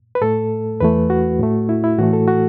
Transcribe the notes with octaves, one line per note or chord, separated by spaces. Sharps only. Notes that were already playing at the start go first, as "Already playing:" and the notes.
B4
A2 A3 A4
E2 E3 A3 B4
F#4
A2 A3
E4
E4
A2 E3 A3 F#4
A4
F#4